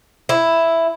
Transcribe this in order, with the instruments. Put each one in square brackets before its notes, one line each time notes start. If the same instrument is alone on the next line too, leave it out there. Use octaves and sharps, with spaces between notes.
[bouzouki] E4